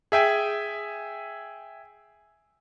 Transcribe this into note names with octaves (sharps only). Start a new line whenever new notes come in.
G#4 E5 G5 G#5